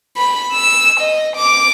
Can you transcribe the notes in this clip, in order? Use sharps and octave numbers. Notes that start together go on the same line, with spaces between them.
B5
E6
D#5
D6